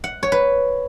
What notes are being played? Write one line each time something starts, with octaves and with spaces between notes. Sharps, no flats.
F#5
C#5
B4